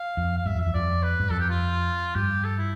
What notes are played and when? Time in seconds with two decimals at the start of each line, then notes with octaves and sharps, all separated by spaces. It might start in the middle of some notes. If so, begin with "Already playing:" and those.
Already playing: F5
0.17 F2
0.37 F5
0.46 G2 E5
0.55 F2
0.60 E5
0.65 E2
0.74 F2 D5
1.03 B4
1.20 G2
1.30 F2 A4
1.39 G4
1.50 F4
2.15 G2 G4
2.44 A4
2.58 E4